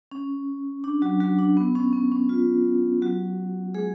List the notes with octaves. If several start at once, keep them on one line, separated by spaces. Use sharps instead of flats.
C#4
D4
F#3 F#4
F#3 F#4
D4
B3
C#4
B3
C#4
F4
F#3 F#4
G#3 G#4